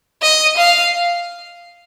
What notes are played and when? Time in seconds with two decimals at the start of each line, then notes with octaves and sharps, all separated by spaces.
0.22 D#5
0.57 F5